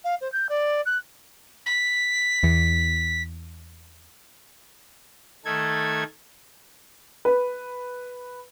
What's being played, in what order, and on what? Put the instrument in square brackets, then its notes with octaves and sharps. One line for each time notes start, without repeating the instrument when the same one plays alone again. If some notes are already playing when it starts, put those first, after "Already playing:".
[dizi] F5
C5
G6
D5
F#6
[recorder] B6
[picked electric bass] E2
[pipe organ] D#3 A3 A4 G#6
[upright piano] B4